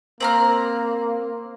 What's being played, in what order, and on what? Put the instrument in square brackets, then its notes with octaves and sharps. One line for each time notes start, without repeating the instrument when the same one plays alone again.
[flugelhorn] A#3 [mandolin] C4 A#5 F6